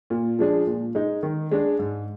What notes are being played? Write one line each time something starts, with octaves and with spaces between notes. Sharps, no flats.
A#2
F3 G#3 D4 G#4
A#2
G#3 D#4
D#3
G#3 D4 G#4
G#2